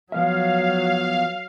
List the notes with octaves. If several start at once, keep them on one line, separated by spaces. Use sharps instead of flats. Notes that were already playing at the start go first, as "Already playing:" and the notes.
F3 F#3 B3 E5 F5